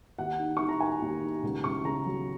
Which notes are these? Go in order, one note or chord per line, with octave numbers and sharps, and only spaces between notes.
D#2 F#5
D#4
D#3 C#6
A#5
A#3 G#5
D#2
D#4
C#2
C#2 C#6
C#3 A#5
F#3